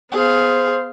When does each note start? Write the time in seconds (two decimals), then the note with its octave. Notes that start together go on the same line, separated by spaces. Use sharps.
0.12 B3 G#4 C5 F5